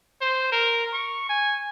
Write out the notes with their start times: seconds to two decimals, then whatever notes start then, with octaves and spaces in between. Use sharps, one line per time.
0.21 C5
0.52 A#4
0.93 C#6
1.29 G#5